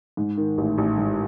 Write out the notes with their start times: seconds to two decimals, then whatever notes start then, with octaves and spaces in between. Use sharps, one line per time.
0.17 G#2
0.37 D#3
0.58 A1
0.78 A1
0.98 G#2